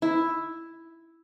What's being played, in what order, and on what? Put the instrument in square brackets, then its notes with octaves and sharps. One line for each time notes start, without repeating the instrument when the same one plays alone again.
[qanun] E4